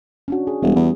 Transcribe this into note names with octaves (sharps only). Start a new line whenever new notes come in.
C#4 D4 F#4
G#4
E1 G3
E2